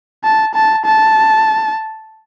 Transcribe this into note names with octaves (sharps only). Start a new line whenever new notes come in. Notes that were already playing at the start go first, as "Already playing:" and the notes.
A5
A5
A5